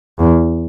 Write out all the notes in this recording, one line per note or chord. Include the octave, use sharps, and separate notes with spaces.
E2